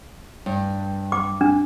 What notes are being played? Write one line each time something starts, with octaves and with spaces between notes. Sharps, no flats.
G2
D6
D4